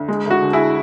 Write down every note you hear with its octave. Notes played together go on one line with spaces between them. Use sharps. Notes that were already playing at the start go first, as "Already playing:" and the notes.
Already playing: D2
G#3
D2 F#4
D3
E4 G#4